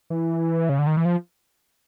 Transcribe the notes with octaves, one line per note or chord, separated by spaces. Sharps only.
E3
C#3
D3
D#3
E3
F3